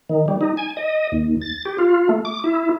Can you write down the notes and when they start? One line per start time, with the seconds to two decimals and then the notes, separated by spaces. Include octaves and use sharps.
0.09 D#3
0.28 G3
0.41 D#4
0.57 G#5
0.77 D#5
1.12 D#2
1.41 A6
1.65 G4
1.78 F4
2.09 A3
2.25 D6
2.44 E4